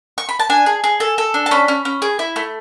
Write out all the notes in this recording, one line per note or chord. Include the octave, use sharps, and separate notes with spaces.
C#6
B5
A5
D4 G#5
G#4
G#4
A4
A4
D4
A5
C#4 B5
C#4
C#4
G#4
E4
A3